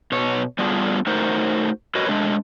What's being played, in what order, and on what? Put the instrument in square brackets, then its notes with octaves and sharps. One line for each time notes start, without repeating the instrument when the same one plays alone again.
[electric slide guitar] B2 C#5
G3 A3 B3 D4 F4 G#4
A3 D#4 F#4 A#4 C5
F#4 A#4 B4 C#5 D#5
G#3 A3 D4